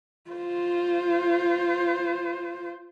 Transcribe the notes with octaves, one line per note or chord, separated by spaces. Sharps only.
F4 C5